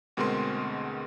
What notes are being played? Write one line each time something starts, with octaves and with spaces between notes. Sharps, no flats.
D2 B2 G#3 C4 A#4 C6